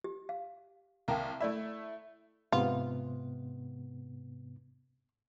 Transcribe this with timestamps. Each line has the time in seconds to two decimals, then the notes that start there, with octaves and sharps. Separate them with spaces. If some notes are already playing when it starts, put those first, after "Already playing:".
0.04 G4
0.29 F5
1.08 C2 A#4 F5 G5 A5
1.40 A3 E4 D5 E5 B5
2.52 G#2 C3 B3 F4